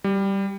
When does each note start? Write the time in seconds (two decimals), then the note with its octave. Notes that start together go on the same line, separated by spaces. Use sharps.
0.04 G3